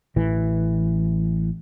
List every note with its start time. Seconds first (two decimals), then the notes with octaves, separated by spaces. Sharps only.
0.16 A1 E3